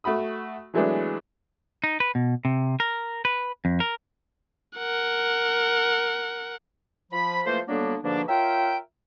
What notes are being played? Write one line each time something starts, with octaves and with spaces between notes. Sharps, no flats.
A3 F#4 B5 D#6
E3 F#3 G#3 A3 B3 D4
D#4
B4
B2
C3
A#4
B4
F2
A#4
A#4 F#5
F3 B5
E3 F3 A3 A#3 A4 C5
D3 F#3 G3 A#3 B3 D4
G#2 B2 D3 F3 A#3 D4
F4 A#4 C#5 E5 G5